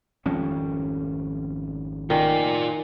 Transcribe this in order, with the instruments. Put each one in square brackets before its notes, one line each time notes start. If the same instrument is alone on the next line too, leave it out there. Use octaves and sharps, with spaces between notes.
[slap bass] G#1 G3 C#4 [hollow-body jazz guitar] F2
[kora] D#3 [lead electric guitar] F4 D5